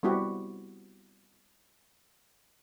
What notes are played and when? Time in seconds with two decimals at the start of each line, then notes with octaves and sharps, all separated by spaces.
0.03 G3 B3 C4 E4 F#4 G4